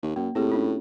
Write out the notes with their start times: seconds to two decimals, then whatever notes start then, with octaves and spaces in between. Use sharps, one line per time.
0.03 D#2
0.16 F#2 A#3
0.35 A2 C4 G4 G#4
0.49 C#4 D4 F4